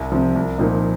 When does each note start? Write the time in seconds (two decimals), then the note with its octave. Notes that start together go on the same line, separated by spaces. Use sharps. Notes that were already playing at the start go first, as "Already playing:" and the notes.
Already playing: C2
0.12 C3 F3
0.35 C2
0.58 A#2 F3 A#3 D#4